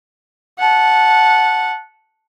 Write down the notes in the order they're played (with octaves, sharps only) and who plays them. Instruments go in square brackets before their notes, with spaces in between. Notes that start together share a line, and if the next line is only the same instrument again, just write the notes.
[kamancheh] F#5 A5